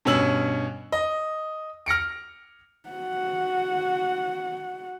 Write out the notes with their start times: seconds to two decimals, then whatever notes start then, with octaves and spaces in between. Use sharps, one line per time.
0.05 G2 B2 C#4 E6 F#7
0.92 D#5
1.86 F6 A#6 C#7 D7
2.89 F#4 F#5